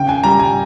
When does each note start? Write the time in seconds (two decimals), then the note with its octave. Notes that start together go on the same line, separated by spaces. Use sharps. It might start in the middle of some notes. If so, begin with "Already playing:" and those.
Already playing: C#3 G5
0.09 G#5
0.24 G3 A#5
0.40 G#5